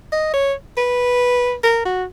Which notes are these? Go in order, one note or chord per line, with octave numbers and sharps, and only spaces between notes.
D#5
C#5
B4
A#4
F#4